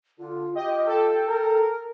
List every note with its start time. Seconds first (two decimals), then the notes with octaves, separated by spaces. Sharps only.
0.19 D3 F4
0.55 F4 G4 D#5 G5
0.87 A4
1.28 A#4